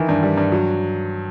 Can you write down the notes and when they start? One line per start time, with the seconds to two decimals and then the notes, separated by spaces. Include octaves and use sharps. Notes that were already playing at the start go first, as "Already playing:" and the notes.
Already playing: D#3 E3
0.09 G2
0.23 G3
0.37 G2
0.52 F#3